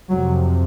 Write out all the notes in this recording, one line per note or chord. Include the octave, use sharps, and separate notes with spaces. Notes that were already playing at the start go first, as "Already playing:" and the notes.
F2 C3 F#3